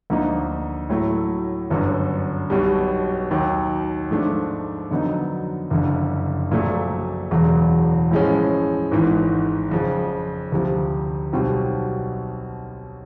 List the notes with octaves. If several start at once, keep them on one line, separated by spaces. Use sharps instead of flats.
D2 D3 F3 A#3 D#4
A2 F#3 A3
G1 F#2 D3
B1 B2 G3
D#2 D#3 F#3
G#2 F3 A3 D4
F2 D3 F#3 B3 D#4
F#1 F2 D3
A#1 A#2 F#3 A3
E1 E2 C#3 F#3
A2 F3 G#3 C#4
G#1 G#2 E3
F2 C#3 F3
D2 C3 F3
B1 B2 G3 C4 F4